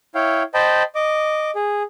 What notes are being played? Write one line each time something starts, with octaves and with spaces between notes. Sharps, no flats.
E4 C#5 F5 G5
C5 D#5 G5 A5 B5
D#5 D6
G#4